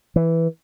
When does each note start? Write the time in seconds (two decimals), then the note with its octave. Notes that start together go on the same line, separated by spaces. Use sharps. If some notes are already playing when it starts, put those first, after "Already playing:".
0.16 E3